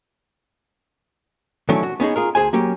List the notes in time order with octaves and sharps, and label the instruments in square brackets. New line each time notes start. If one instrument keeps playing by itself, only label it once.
[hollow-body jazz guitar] D#3 E3 F#3 A3 C#4 D4
F#4
B3 C#4 D#4 G#4
F4 G#4 A#4
D2 G#4 C5 G#5
F#3 A#3 C#4 G4